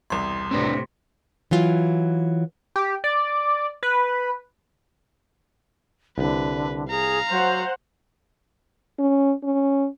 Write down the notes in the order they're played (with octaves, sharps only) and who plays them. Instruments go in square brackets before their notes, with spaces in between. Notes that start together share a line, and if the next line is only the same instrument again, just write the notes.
[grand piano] E1 C2 [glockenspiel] C6
[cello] A2 C3 [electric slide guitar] C4 D4 B4
[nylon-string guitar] E3 F#3 F4
[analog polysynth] G4
D5
B4
[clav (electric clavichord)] C2 [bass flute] D3 [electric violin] B4
[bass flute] G#4 [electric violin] F5 A#5
[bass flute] F#3 [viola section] C5 F#5
[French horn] C#4
C#4